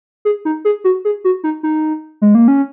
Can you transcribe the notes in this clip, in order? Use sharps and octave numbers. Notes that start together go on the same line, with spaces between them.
G#4
D#4
G#4
F#4
G#4
F#4
D#4
D#4
G#3
A#3
C#4